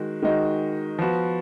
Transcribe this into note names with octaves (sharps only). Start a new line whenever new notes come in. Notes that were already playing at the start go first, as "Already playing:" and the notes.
Already playing: D#3 G#3 F#4
D#3 G#3 D#4 F#4
F3 B3 F#4